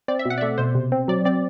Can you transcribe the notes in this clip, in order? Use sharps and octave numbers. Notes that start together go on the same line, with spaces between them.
C4 D5
E5
B2
F#5
D5
A3 E5
B2 C5
C3
C4
F#3 D5
C4 D5